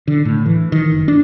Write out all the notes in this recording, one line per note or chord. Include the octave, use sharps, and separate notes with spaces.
D3
A2
E3
D#3
F#1
D4